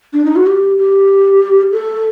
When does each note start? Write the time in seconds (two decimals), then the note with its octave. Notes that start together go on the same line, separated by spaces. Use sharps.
0.13 D4
0.25 D#4
0.36 F#4
0.46 G4
0.78 G4
1.72 A4